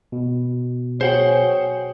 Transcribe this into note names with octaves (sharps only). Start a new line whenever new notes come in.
B2
F#4 G#4 C5 C#5 F#5 G5